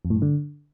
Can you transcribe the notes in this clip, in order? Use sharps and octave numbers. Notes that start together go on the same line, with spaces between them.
F2
A2
G2
D3